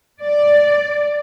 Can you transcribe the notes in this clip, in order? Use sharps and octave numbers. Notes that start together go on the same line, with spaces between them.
D5